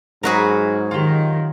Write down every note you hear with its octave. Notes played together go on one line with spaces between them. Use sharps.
G#2 F#3 F#4 G#4 A#4 B5
D#3 F4 G4